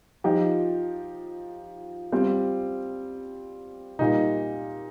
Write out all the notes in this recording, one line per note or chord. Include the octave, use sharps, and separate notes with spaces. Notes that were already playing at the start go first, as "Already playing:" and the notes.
F3 D#4 G4
G3 C4 F4
A#2 G3 D#4